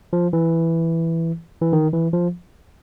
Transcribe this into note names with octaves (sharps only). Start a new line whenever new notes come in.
F3
E3
E3
D#3
E3
F3